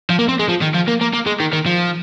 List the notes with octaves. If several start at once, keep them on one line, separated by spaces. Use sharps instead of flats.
F3
A#3
C4
G#3
F3
D#3
F3
A#3
A#3
A#3
G#3
D#3
D#3
F3